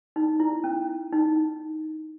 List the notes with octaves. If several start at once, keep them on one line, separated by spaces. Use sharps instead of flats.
D#4
E4
C#4
D#4